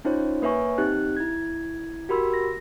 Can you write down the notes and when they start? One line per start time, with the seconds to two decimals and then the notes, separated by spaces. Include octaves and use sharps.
0.05 C#4 D#4 F4 C5 C#5
0.42 A#3 B4 C#5 E5 G#5 C#6
0.78 C4 D#4 G4 F#6
1.17 E4 G#6
2.09 F#4 G4 A#4 B5 C6 E6
2.34 A#6